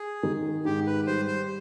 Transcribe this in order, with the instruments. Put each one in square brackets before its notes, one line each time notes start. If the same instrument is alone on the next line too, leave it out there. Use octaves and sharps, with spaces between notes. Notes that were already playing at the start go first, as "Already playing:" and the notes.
Already playing: [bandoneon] G#4
[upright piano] D#3
[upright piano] G#2 [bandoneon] G4
[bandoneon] B4
[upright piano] G3 [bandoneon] C5
[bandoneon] C5